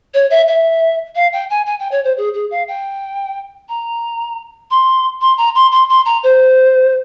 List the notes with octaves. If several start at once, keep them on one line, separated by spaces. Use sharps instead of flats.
C#5
E5
E5
F5
G5
G#5
G#5
G5
C#5
C5
G#4
G#4
F5
G5
A#5
C6
C6
A#5
C6
C6
C6
A#5
C5